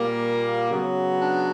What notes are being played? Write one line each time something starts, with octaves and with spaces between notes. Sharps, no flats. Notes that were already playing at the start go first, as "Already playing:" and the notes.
Already playing: A#2 G3 A#3
C#3 F#3 B3
D4